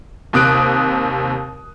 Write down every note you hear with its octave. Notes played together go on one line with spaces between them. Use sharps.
D#2 C3 D#6 F#6 D7